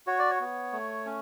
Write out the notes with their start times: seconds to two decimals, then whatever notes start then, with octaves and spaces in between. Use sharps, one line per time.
0.07 F#4 C#5
0.19 D5
0.30 C#5
0.40 B3
0.73 A3
1.06 C#4